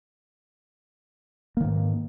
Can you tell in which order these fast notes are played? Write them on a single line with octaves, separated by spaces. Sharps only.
A#3 D#3 G#2